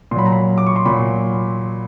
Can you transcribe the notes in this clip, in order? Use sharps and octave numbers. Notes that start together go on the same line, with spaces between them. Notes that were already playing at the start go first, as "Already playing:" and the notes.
A#2 F#3 B5 C6
A#5
B5
D6
C#6
C6
A#2 F#3 B5